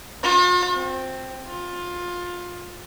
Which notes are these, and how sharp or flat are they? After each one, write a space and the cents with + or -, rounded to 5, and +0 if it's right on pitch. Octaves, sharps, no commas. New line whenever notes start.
F4 +45
C4 +0
F4 +20